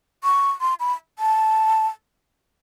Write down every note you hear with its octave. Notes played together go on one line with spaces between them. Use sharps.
C#6
C6
B5
A5